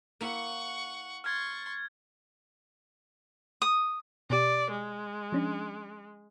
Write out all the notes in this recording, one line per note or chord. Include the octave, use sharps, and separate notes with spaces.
A#3 E4 F#5 C#6
C6 C#6 F6 G#6 A6
D#6
B2 G4 D5
G#3
F3 C#4 D4